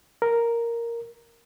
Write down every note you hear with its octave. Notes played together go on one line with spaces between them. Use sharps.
A#4